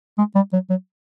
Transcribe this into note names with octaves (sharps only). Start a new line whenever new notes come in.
G#3
G3
F#3
F#3